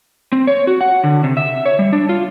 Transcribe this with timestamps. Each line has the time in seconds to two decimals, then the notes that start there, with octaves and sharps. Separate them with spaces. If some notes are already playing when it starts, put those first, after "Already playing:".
0.32 C4
0.47 C#5
0.67 F#4
0.81 F#5
1.04 D3
1.24 C3
1.37 E5
1.66 C#5
1.79 G3
1.93 D4
2.09 F4